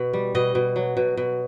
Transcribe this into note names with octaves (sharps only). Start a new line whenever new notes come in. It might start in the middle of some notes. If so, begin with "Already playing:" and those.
Already playing: B2
G3
B2 D#5
B2
F#3
B2
B2